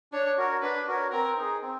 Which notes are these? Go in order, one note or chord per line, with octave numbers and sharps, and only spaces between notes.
D4 C#5
F#4 A#4 C#5
D4 B4
F#4 A#4 C#5
C4 A#4
D#4 G#4
C4